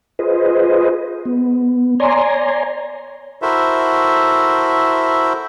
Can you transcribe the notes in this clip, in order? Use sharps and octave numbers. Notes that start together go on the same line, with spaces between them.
F4 G#4 B4 C5 D#5
B3
C#5 D5 G#5 A#5 C6
E4 F#4 A4 A#4 C5 E5